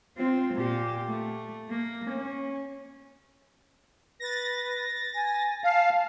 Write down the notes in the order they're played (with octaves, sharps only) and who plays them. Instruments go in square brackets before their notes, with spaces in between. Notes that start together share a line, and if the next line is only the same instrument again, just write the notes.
[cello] C4 F4
A#2 G4
A3
A#3
C#4
[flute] B4 [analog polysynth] A6 A#6
[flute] G#5
[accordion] F5 [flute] A5